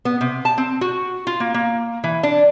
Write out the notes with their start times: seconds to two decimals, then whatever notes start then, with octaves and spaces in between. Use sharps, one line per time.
0.05 B3
0.21 C3
0.45 A5
0.58 C4
0.81 F#4
1.27 F4
1.40 A#3
1.54 A#3
2.04 E3
2.23 D4